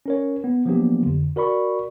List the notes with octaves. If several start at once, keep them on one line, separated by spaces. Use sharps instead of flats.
C#4 A#4 C#5
B3
F3 F#3 A#3 B3 D4 G4
F2 D3
F#4 A#4 D5 B5 C#6